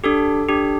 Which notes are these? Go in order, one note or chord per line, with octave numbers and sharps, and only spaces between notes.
D4 G4 A4
D4 G4